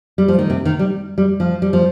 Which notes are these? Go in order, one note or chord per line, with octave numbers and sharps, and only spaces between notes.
G3
F3
D#3
C3
D#3
G3
G3
F3
G3
F3